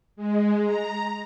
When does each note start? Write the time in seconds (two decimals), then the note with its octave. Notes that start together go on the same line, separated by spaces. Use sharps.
0.16 G#3
0.64 A#5